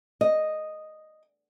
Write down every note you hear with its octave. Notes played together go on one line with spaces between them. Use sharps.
D#5